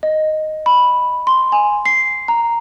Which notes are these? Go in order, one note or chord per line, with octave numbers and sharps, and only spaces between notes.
D#5
B5
C6
G#5
C7
A#5